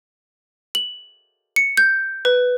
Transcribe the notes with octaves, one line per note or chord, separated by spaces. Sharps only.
F#7
C#7
G6
B4